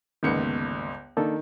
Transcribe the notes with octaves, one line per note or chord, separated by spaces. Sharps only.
G1 C#2 D#3 A#3 B3 C#7
D#3 A#3 D4 A4